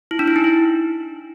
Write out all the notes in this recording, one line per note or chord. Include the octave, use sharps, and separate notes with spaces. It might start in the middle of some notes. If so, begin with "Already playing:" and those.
E4
D4
E4
D#4
E4